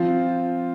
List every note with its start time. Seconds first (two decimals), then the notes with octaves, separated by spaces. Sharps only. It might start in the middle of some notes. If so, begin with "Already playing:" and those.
Already playing: F3 C4 F4